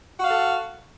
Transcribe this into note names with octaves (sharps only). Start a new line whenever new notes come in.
F#4 A4 F5